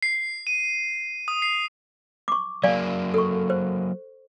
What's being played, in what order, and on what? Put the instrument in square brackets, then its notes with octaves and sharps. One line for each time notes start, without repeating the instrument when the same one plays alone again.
[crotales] C7
D#7
D#6
C7
[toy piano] C#6 D6
[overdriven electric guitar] F#3 A#3 [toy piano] D5 F5 G#5
[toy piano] A4 C#6
C5